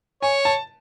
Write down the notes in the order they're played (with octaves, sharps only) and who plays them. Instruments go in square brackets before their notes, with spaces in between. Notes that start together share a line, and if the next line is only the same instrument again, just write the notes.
[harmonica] C#5 [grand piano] G#5
[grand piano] A5